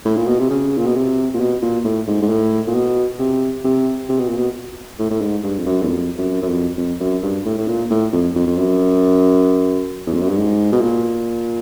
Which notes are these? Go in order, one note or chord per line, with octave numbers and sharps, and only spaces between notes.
A2
A#2
B2
C3
C#3
A#2
B2
C3
A#2
B2
A#2
A2
G#2
G#2
A2
A#2
B2
C3
C3
C3
B2
A#2
B2
A2
A2
G#2
G2
F2
F#2
E2
F2
F#2
F#2
F2
F2
F#2
G2
A2
A2
A#2
A2
F2
F2
F2
F#2
E2
F2
F#2
G2
G#2
B2
A#2